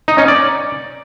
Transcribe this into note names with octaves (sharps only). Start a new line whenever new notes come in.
D#4
C#4
D5